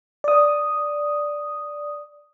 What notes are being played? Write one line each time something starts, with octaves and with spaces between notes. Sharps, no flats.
D5 D#6